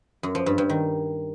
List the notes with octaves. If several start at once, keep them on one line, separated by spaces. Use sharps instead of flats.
F#2
F3
G2
G2
D#3